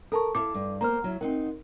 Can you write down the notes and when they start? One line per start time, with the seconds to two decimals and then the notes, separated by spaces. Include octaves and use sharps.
0.12 A4 A#4 A5 C#6
0.35 E4 A4 F5 D6
0.54 G2
0.81 A#3 B3 C5 A#5 F6
1.04 F#3 E4
1.21 C4 D#4 A#4 F#5